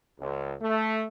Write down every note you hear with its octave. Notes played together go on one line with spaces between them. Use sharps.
C#2
A3